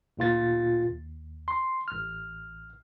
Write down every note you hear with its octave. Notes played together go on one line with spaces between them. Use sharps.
D2 A#2 F4 A6
D#2
C6
A1 F6